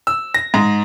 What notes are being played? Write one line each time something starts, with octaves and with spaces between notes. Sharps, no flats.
E6
A#6
G#2